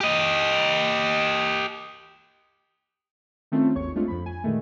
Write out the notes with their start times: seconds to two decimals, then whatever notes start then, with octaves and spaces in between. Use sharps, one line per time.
0.01 G4 D#5
3.52 D#3 A3 C4 C#4 F4
3.75 G#1 D#2 C#5 C#6
3.95 G#3 A3 C4 D4 F4
4.08 F2 F3 B5
4.26 G#5
4.44 A#2 D3 D#3 G#3 A3